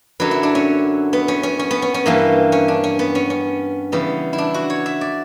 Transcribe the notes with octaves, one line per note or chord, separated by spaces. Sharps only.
F#2 D3 F#3 B4
E4
D4
C#4
B3
C#4
C#4
C#4
B3
C#4
C#4
G2 E3 A#3
C#4
D4
C#4
B3
C#4
C#4
C#3 E3 G3 B3
E4
D4
F#4
C#5
E5
D5